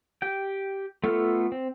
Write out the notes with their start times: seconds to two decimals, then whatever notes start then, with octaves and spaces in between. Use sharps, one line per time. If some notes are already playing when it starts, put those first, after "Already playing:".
0.22 G4 G5
1.04 A3 B3 F4 A4 F6
1.52 C4